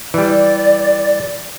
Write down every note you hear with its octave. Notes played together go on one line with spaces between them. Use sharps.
E3 G3 D5